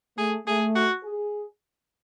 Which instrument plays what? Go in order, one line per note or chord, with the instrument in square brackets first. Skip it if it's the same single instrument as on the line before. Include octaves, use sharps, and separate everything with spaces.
[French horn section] A3 [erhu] G#4
[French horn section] A3 [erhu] G#4
[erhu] F#4
[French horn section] G#4